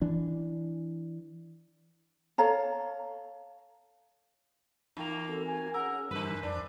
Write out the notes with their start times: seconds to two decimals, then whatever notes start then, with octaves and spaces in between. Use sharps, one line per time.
0.02 E3 D4
2.38 A4 C#5 F5 A#5
4.97 E2 A#3 D#4 G5 F7
5.29 C4 F#4 A4
5.45 G#5
5.74 C#4 G#4 A#4 F#5 G#5 E6
6.11 G2 D3 E3 G3 B4 C5
6.43 F2 D4 D5